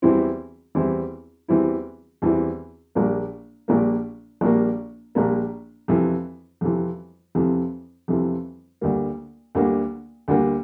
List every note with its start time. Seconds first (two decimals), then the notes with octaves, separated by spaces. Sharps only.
0.02 E2 E3 G3 C4 E4
0.75 E2 E3 G3 C4 E4
1.48 E2 E3 G3 C4 E4
2.22 E2 E3 G3 C4 E4
2.95 A#1 A#2 G3 A#3
3.68 A#1 A#2 G3 A#3
4.41 A#1 A#2 G3 A#3
5.15 A#1 A#2 G3 A#3
5.88 F2 C3 E3
6.61 F2 C3 E3
7.35 F2 C3 E3
8.08 F2 C3 E3
8.81 D2 D3 G3 A#3
9.55 D2 D3 G3 A#3
10.28 D2 D3 G3 A#3